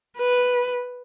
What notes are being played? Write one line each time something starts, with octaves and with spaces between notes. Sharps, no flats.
B4